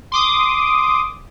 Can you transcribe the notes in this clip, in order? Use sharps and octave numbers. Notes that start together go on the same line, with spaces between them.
C6 D6 D#6